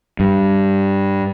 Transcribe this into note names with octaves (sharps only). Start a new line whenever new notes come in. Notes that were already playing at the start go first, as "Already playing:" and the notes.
G2